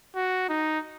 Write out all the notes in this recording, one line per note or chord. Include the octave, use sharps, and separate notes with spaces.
F#4
D#4